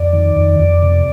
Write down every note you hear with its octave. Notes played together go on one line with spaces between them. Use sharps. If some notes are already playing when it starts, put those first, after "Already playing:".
Already playing: F2 D5
D#3
F2
F2
C3